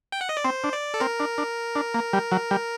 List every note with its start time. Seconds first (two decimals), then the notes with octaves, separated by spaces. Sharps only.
0.12 G5
0.21 F#5
0.29 D#5
0.37 D5
0.45 C4 C5
0.64 D4
0.73 D5
0.94 A4
1.00 C4 A#4
1.20 D4
1.38 D4
1.75 D4
1.94 A#3
2.13 G3
2.32 F#3
2.51 G3